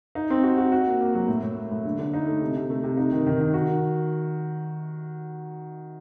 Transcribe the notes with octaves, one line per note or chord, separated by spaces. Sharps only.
D#4
C4
F#4
F#4
F#4
A#3
A#3
F#3
A2
A2
A#3
A2
D3
D3
D#4
A3
C3
C3
A3
C3
D#4
D#3
D#3
D#3
F#4